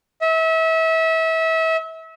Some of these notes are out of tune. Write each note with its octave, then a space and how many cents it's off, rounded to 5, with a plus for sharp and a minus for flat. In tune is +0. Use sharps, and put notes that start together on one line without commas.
E5 -30